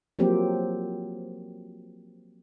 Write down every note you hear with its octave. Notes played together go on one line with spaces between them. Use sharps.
F3 F#3 A#3 C4 G4